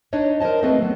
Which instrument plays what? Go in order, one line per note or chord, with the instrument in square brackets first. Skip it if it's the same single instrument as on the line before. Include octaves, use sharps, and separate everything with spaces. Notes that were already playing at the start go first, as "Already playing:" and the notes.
[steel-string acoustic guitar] D4 D#4 C#5 D#5
A#4 C5 C#5 D#5 A5
A3 C4 G#4 A4 B4 D#5
F#3 B3